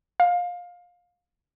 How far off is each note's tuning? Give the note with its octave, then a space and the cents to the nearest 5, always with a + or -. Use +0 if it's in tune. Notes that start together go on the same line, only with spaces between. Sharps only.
F5 +20